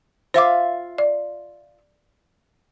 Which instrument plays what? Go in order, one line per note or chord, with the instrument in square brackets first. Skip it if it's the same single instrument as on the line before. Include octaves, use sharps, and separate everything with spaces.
[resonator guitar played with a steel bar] F4 E5 F5 [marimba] C5 D6
[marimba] D5